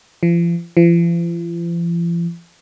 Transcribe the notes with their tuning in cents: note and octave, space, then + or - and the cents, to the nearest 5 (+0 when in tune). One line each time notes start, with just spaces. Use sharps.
F3 -40
F3 -45